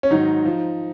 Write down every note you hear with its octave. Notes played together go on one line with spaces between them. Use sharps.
C#4
G#2 D#3 F#3 D#4
F3